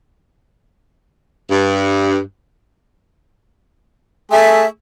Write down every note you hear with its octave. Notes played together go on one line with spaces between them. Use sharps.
G2
A3 G#4 E5